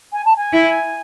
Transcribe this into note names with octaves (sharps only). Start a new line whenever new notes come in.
G#5
A5
G#5
E4